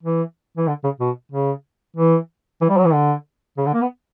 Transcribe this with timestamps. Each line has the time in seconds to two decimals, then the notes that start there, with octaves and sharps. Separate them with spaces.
0.03 E3
0.57 E3
0.68 D3
0.84 C#3
1.00 B2
1.32 C#3
1.97 E3
2.61 E3
2.69 G3
2.77 F#3
2.85 E3
2.93 D3
3.58 C#3
3.66 D3
3.74 A#3
3.81 B3